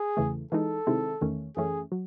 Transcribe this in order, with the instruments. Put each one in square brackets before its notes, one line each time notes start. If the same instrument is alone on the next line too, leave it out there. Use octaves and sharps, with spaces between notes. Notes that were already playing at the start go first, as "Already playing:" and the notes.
Already playing: [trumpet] G#4
[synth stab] E2 C#3 E3 A3
[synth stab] E3 G#3 D#4 [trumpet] A4
[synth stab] C3 D#3 G#3 C4 E4
E2 D#3 A3 C#4
[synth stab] F#2 E3 A3 C#4 [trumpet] G#4
[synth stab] F#3